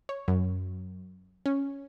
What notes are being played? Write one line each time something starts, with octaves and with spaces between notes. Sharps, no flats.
C#5
F#2
C#4